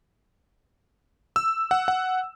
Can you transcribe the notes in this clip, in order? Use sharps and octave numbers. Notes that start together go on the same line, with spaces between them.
E6
F#5
F#5